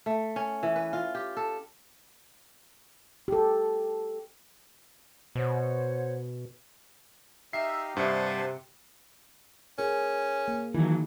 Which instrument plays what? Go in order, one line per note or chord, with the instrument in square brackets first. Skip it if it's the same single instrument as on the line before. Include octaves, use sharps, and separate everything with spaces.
[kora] A3
C#4
E3
B4
F4
G4
A4
[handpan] G4 A4
[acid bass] B2 [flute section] C5 C#5 F#5
[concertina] D#4 G4 F5 [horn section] E5 [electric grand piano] C7
[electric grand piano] G2 D4 [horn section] C3 [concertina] C5 F#5 A5
[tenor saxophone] C#4 [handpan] G#4 A#4
[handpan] A#3
[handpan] D#3 [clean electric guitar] E3 F#3